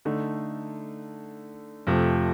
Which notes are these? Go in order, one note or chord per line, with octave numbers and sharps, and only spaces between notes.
D3 A3 D#4
F2 C3 F3 A3